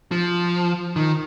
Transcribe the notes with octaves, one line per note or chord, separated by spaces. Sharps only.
F3
D#3